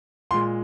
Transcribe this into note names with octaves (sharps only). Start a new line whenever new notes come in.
A#2 G#3 C6